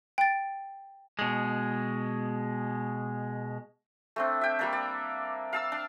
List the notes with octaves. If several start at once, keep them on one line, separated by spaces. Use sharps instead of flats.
G5 A6
B2 G#3
A3 C4 D4
E5 G5
G3 A#3 D4
D5
F5 A5 E6
D4